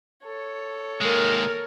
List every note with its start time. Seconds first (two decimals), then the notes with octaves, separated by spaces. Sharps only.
0.25 A4 C#5
1.02 D#2 G#3 A#4